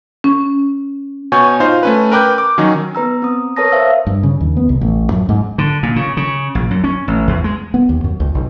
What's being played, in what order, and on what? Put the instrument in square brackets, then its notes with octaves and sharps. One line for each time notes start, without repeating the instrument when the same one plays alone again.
[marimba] C#4
[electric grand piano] B2 C#5 G#5 C#6 G6
D#4 F4 C5 F5
A3 C#4 B4
A#4 B4 G5 D6 F#6 G6
D6
D#3 F#3 C#4 D#4
[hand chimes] B3 B4 A#5 E6
C4 D#6
A#4 B4 C#5 A5 D#6 A#6
C5 E5 F5 E6
[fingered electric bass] G2
C#3
D#2
B3
C2
A1
F#2
G#2
[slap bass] D3
A#2
C#3
C#3
A#1
F#2
C#4
A1
E2
G#3
[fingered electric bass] B3
D#2
F#2
C#2
B1